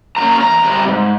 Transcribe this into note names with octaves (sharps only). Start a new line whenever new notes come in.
C#3 F3 A#3 C#4 A#5
E2 A#5
C3 G3
G#2